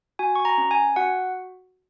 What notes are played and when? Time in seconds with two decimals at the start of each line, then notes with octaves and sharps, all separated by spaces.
0.19 F#4 G#5
0.35 C#6
0.45 A#5
0.58 C#4
0.71 G#5
0.96 F#4 F#5